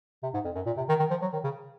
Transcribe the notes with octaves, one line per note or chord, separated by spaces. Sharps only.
C3
G#2
F2
F#2
A#2
C3
D#3
D#3
F3
F#3
D#3
C#3